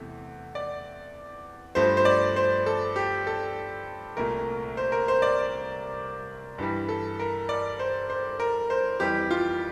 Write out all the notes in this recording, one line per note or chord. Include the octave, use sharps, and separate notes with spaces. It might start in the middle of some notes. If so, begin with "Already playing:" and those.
Already playing: E2 C3 E3 A3
D5
G2 F3 A3 C5
C5
D5
C5
A4
G4
A4
C2 A#2 A3 A#4
C5
A#4
C5
D5
G2 E3 G3
A4
A#4
D5
C5
C5
A#4
C5
F2 E3 G3 G4
F4